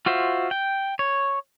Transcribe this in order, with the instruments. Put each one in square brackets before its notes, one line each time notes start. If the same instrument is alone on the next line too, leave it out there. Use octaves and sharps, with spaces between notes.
[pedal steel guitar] F4 F#4 C5 E5
G5
C#5